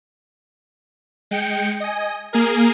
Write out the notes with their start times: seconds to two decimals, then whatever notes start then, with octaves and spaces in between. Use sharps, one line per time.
1.31 G#3 G5 C#7
1.80 D#5 G#5
2.33 A#3 G#4 A#4